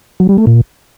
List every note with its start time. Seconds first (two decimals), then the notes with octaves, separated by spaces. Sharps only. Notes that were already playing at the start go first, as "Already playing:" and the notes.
0.20 F#3
0.29 G3
0.38 A3
0.47 A#2